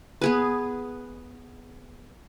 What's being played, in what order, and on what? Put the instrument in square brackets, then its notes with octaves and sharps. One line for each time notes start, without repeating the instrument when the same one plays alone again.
[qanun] B3 G#4 B4